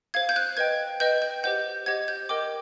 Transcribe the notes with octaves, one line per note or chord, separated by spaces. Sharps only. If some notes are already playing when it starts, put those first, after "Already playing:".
C5 F5 G#6
G6
F#6
B4 D#5 G5 G#6
B4 D#5 G5 G6
G6
G4 C5 D#5 F#5 G6
G4 C5 D#5 F#5 G#6
G6
A#4 D#5 G5 D6